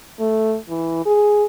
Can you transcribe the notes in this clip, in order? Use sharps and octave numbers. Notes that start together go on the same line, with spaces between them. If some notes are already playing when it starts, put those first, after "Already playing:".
A3
E3
G#4